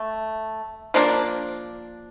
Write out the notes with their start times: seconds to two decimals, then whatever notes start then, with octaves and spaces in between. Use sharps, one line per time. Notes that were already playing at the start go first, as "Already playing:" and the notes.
Already playing: A3
0.94 F3 A#3 D4